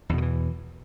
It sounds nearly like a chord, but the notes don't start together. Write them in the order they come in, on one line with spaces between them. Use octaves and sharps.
E2 B2 D#3 E3